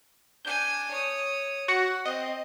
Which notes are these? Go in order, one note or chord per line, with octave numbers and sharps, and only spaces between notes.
D4 G#5 G6
C#5 D#6
F#4 F#5
C4 D#5